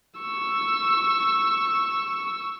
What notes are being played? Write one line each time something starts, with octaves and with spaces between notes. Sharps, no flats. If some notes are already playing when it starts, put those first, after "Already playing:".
C#6 E6